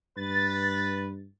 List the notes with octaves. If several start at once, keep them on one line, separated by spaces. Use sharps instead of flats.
G2 B4 A6